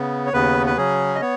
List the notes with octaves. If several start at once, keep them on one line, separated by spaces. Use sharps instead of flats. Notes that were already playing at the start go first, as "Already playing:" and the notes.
Already playing: C#3 B3
C#5
D#2 C#3 B3 B4
B4
C#3 F#3 C#4 G#4
D#5
B3 C#5